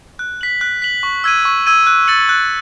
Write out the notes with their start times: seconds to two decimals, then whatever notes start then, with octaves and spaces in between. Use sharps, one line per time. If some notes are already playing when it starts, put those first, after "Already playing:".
0.19 F#6
0.41 B6 F#7
0.61 F#6
0.82 B6 F#7
1.03 C#6
1.24 E6 G#6 D#7
1.45 C#6
1.66 E6 G#6 D#7
1.87 F#6
2.08 A6 C#7 F#7
2.29 F#6